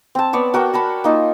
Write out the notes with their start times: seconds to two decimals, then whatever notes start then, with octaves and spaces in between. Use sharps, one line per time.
0.15 C4 A5
0.33 B3 C#5 D5
0.54 F#4 A#4 F#5 G5
0.74 A#4 A5 B5
1.04 A#3 D#4 F4